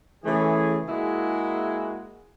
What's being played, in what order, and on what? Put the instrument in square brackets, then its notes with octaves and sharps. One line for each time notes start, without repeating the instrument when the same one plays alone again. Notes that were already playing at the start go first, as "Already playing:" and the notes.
[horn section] C#3 E3 A3 G#4
G#3 A#3 E4 F#4 G#4